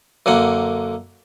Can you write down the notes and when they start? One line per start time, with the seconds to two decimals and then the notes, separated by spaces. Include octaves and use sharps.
0.26 F#2 D3 A#3 F#5